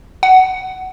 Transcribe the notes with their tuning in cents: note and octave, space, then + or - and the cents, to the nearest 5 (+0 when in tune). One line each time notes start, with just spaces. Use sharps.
F#5 +20